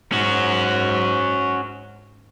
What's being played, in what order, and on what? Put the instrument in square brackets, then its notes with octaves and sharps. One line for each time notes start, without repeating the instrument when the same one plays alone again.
[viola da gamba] G#2 [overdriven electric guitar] C#4 F#4